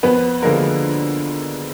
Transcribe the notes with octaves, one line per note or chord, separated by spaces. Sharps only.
F2 B3 B4
D3 F3 G#3 A#3 A#4